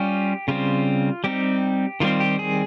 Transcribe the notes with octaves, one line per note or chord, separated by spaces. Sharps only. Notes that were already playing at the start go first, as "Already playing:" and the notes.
Already playing: G3 C#4 F4 G4
C#3 G3 C4 F4
G3 C4 D#4 G4
D#3 G3 C4 F4
G4
G#4